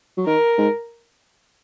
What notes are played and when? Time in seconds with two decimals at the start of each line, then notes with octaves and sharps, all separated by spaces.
0.18 F#3
0.26 D#3 A#4
0.58 G#2